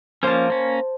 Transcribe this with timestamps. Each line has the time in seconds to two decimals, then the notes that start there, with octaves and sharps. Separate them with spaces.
0.23 F3 A#3 C#4 C5 A5
0.50 A#3 C#4